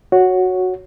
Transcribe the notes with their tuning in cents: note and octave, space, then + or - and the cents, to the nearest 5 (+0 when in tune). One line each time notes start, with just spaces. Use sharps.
F#4 -5 C#5 +0